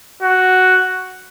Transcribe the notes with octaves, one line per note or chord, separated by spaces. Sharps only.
F#4